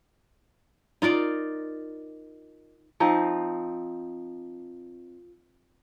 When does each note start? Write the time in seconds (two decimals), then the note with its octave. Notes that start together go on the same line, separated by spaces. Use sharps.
1.02 D#4 F4 A#4 D5
3.00 F3 C4 D#4